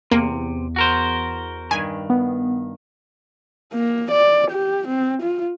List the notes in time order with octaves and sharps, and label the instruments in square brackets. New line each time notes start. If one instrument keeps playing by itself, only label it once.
[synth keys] E2 [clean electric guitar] C3 [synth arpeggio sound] A#3
[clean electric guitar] F#4 A#4 C5
[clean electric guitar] G2 D#3 [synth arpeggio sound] G#5
[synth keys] B3
[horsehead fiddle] A#3
D5
G4
C4
F4